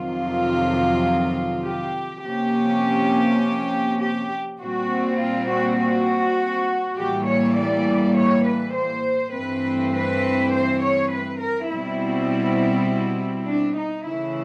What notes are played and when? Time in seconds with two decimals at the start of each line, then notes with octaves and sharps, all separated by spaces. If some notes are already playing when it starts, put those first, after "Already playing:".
Already playing: F2 C3 D#3 F#3 F4
1.64 G4
2.24 C3 F3 A#3 C#4 G4
4.01 G4
4.60 A#2 G3 C4 F#4
5.20 F4
5.49 F#4
5.79 F#4
6.97 A2 E3 G3 A#3 G4
7.27 C#5
7.56 D5
8.16 C#5
8.45 B4
8.74 C5
9.33 G2 E3 A3 C4 B4
9.93 B4
10.52 C5
10.82 C#5
11.11 B4
11.41 A#4
11.71 B2 G3 C4 E4
13.47 D4
13.77 D#4
14.06 C#3 E3 A3 E4